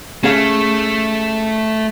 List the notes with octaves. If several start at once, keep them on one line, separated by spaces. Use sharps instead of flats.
A3 C#4 G#4 F5